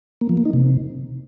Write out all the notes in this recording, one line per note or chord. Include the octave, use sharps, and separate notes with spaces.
A#3
F3
A#3
D#4
C3